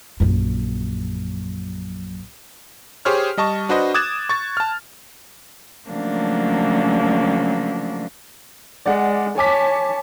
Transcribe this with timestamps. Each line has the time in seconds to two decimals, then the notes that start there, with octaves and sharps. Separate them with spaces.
0.20 A#1 F#2
3.05 G4 G#4 C5 C#5 F6
3.37 G3 D#5 A5 C#6
3.69 D4 F#4 B4 C5 D#5
3.94 D6 D#6 F#6 G#6 A6 E7
4.29 C#6 A6
4.57 A5 F6
5.90 C#3 F3 F#3 A3 A#3 D4
8.86 G#3 D5 F#5
9.38 C#5 G#5 A5 D6 B6